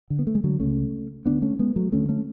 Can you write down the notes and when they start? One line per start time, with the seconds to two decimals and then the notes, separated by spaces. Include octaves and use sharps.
0.10 D3
0.19 B3
0.27 A3
0.35 G#3
0.44 D3 F#3
0.60 C#2 C#3 A3 C#4
1.26 D2 D3 B3 D4
1.42 A3 C#4
1.59 G#3 B3
1.76 F#3 A3
1.92 D2 D3 A3 C#4
2.09 A3 C#4